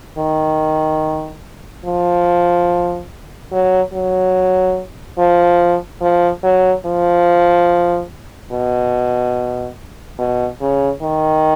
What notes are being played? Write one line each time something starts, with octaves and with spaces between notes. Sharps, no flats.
D#3
F3
F#3
F#3
F3
F3
F#3
F3
B2
B2
C#3
D#3